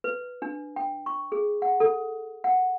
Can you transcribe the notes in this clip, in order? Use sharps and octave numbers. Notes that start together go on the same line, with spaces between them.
B4
D4
G5
C#6
G#4
F#5
A4
F#5